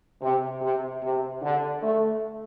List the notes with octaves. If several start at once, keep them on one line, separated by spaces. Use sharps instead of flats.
C3
C3
C3
D3
A3